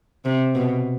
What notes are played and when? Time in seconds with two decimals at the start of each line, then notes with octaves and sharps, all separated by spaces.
0.25 C3
0.55 B2